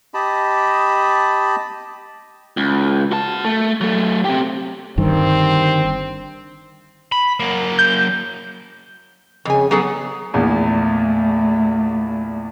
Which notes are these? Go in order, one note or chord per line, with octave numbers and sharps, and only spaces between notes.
G4 D#5 A5 B5
C#2
F#4 A5
A3
F#3 A3
C4 G4
G1 G2 D#3 C4
B5
F#3 A#3
G6
F2 C#3 G#5
F#3 B3 G#4 A4
A#1 E2 A3